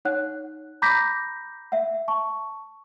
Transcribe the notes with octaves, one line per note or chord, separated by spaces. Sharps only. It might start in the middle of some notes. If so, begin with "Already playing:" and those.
D#4 C#5 F#5 F#6
A#5 B5 D6 G6 A#6 B6
E5 F#5
A5 C#6